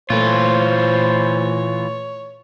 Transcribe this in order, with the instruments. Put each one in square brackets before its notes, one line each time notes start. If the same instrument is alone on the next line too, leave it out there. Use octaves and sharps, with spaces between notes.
[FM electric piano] A#2 A3 [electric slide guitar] E3 F4 [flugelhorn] C5 [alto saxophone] C#5